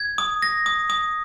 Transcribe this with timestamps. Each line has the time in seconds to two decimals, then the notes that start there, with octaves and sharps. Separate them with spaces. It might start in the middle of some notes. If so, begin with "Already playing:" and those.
Already playing: G#6
0.18 D#6
0.42 A#6
0.66 D#6
0.90 D#6